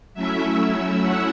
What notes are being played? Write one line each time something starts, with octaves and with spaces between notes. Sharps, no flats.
F#3 A3 C#4 E4 E5
E5
F#5